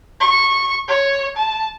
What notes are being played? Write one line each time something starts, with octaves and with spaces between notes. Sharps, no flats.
C#6
C#5
A5